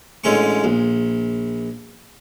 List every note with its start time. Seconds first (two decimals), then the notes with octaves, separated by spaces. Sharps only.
0.24 A1 D3 G#3 C#4 C#6
0.64 A#1